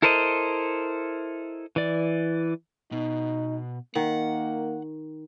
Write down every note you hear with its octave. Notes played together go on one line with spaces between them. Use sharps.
E4 A4 A#4 C5 D#5
E3 D5
B2 D#4
D#3 A#3 F#5